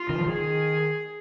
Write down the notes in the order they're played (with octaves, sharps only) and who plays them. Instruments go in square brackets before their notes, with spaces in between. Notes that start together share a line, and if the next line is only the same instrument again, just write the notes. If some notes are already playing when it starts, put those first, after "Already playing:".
Already playing: [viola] F4
[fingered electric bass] D#3
F3
[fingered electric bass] D#3 [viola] G#4